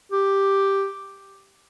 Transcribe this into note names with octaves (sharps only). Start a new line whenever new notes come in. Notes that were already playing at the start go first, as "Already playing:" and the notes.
G4